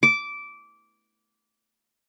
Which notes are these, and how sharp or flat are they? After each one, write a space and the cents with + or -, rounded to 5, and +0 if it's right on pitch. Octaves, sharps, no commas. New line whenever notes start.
D6 -15